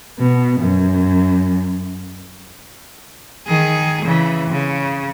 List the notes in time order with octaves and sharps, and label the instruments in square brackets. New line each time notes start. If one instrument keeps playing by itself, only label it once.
[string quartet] B2
F#2
[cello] D#3 G#4
C#3 E3
C#3